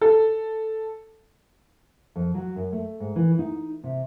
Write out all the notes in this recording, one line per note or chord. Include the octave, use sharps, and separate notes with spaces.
A4
F2
F#3
F#2
A3
G#2
E3
D#4
C3